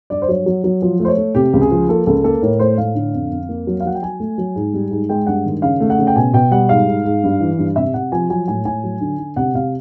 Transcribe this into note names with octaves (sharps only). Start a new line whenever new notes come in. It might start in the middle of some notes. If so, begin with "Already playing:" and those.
G2 D5
C5
F#3 C#5
F#3
F#3
F3
A3
C5
C#5
A3
C3 G4
C#2
G#4
F3
A#3 A4
C#2 A4
A#3 A4
A2 A#4
A3 C5
A2 F5
D3
F2
F2
A#3
F#3
F5
F#3 F#5
G5
F#3 G#5
A3
F#3
G#2
G3
G#2
G#3 G5
G2 F#5
D#3
C#3 F5
A3
F#5
C#3
G5
B2 G#5
B2 G5
G3 F#5
G#2 F5
G#2
G#2
G2
E3
G2
C3 E5
C3 F#5
F3 G#5
F#3 G#5
A2 G#5
A2 G#5
F#3
D3
D3
C3 F#5
C3 F5